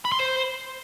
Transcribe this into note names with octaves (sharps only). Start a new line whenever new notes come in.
B5
C6
C5